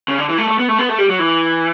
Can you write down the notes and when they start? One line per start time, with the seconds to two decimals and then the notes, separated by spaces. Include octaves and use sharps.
0.08 C#3
0.18 D3
0.29 E3
0.38 A3
0.48 A3
0.59 B3
0.69 A3
0.78 B3
0.89 A3
0.98 G3
1.09 F#3
1.19 E3